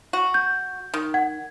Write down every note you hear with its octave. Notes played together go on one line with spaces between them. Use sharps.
F#4
G6
D#3
F#5 G#6